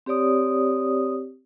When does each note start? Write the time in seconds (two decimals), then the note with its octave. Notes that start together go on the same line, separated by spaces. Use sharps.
0.06 C4 G4 C#5 D5 D#6